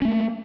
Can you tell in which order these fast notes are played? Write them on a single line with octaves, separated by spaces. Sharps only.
C#4 A3 A#3